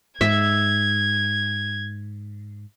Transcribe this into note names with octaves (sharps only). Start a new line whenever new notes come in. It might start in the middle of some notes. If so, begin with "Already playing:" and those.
G#2 E5 G#6